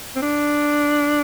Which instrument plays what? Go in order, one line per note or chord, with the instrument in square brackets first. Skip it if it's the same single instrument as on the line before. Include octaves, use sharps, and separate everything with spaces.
[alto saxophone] C4
D4